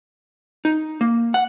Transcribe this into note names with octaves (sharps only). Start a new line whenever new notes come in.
D#4
A#3
F#5